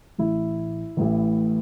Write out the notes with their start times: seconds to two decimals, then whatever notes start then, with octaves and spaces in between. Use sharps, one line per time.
0.18 A1 A2 E3 E4
0.97 A1 A2 E3